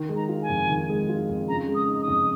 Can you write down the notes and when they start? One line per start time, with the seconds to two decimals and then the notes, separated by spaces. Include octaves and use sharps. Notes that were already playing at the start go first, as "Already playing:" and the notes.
Already playing: D#3
0.09 G#3
0.16 A#5
0.29 F4
0.42 G#5
0.49 F2
0.69 D#3
0.89 G#3
1.09 F4
1.29 F2
1.48 C#3 A#5
1.68 G#3
1.75 D#6
1.88 D#4
2.01 D#6
2.08 F2